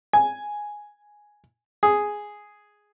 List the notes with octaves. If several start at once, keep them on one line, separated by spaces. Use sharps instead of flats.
G#5
G#4